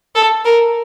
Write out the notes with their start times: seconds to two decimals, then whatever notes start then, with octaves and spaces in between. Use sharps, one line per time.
0.15 A4
0.45 A#4